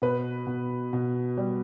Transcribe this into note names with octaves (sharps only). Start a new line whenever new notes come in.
B2 B4
B2
B2
G3